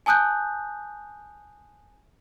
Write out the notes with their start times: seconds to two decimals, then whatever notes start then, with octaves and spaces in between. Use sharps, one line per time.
0.06 G#5 A5 D#6 F#6 G6